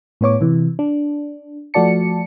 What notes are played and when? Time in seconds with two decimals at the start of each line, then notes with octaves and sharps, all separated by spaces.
0.21 A2 B3 C#5 D6
0.41 C3 E3
0.79 D4
1.74 F3 A3 F#4 D5 A5 C#7